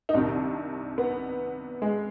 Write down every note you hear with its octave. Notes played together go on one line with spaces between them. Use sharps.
D#4
C2 C3 D#3 D4
B3
G#3